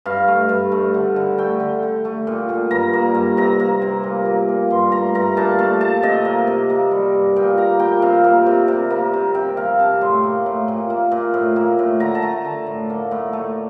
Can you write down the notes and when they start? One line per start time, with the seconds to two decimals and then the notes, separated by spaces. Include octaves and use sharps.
0.06 G2 F5
0.28 A3
0.49 G2
0.72 A3
0.94 D3
1.16 D3
1.38 A3 G5
1.60 D3
1.83 D3
2.05 A3
2.27 A#2
2.49 A#2
2.71 G2 A#5
2.93 A#3
3.15 G2
3.37 C3 A#5
3.60 A#3
3.82 C3
4.03 A#2
4.25 A#3
4.49 A#2
4.70 G2 C6
4.92 A3 A#5
5.15 G2 A#5
5.37 A#2 A5
5.59 A3 A5
5.81 A#2 A5
6.03 C3 D#5
6.25 A#3
6.47 C3
6.70 A#3
6.91 G3
7.14 G2
7.36 A#2 G5
7.58 A#3 A#5
7.79 A#2 G5
8.02 C3 F5
8.24 A#3
8.46 C3
8.68 C3
8.90 A#3
9.14 C3
9.35 C3 G5
9.57 A#3 F5
9.79 C3 A5
10.01 A2 C6
10.23 A#3
10.46 A2
10.68 A#2
10.90 A#3
11.12 A#2
11.34 A2
11.56 A#3
11.79 A2
12.00 D3 A#5
12.15 A5
12.22 A3 A#5
12.45 D3 A5
12.66 A2
12.90 A#3
13.11 A2
13.33 A3